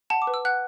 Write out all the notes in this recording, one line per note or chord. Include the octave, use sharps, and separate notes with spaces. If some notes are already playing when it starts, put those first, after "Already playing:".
F#5 A5
D6
B4
E6
F#5 F#6